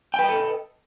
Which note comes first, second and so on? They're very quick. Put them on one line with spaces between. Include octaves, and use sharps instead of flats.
G5 B4 D#5 A4